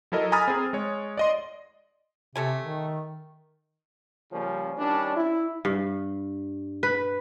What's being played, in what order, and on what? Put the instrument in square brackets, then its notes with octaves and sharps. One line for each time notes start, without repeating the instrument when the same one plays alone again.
[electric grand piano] F#3 E4 A4 A#4 D#5
G#5 A#5 B5 D#6 F6 A6
C4 G#4
G#3 C#5
D5 D#5 C6
[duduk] C3 [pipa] A3 A4 G#5
[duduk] D#3
[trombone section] C#3 F3 G3 A#3 C#4
D#3 G3 C#4 D4
E4
[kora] G2
B4